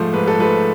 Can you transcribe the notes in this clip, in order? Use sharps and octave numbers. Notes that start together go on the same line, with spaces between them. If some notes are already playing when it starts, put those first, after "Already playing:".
Already playing: G#2 F3 A3 C5
G#2 B4
A4
F3 A3 B4